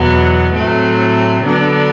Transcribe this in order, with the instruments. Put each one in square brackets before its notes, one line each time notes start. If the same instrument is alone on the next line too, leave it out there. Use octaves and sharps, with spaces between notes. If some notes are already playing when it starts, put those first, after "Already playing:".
Already playing: [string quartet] E2 B2 F#3 B3
A2 F#3 A3 C4
D3 F#3 B3 D4